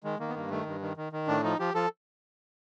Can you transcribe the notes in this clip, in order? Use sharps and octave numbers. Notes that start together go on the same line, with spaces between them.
D#3 G#3
D#3 A#3
B3
G2 A#3
D#3 A3
G2
D#3
D#3
D#3
A2 D4
F3 D#4
F3 G4
F3 A4